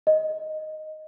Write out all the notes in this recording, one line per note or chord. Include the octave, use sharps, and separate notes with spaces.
D#5